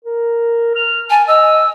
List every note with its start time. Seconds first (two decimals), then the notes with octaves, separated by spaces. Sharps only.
0.05 A#4
0.75 F6
1.10 G#5 A5
1.28 D#5 E6